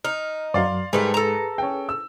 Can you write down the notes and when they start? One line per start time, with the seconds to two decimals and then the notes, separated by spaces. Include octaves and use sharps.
0.05 D#4 F6
0.54 F#2 F#3 D5 F5 C6
0.93 G#2 G3 A3 G#4 A#4 B4
1.14 A4 A#5
1.58 C#4 G5
1.89 E6